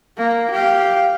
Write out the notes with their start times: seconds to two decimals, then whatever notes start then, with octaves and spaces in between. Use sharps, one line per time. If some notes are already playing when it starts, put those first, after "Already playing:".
0.17 A#3
0.51 G4 F5